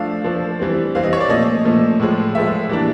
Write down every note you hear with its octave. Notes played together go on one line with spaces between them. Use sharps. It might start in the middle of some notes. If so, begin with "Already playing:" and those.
Already playing: F3 A3 D4 F5
F3 A3 D4
E3 G3 C4
E3 G3 C4 F5
D#5
C#5
D5
A#2 F3 A3 C#4 D#5
A#2 F3 A3 C#4
A2 F3 G#3
A2 F3 G#3 E5
E3 G3 A#3 D4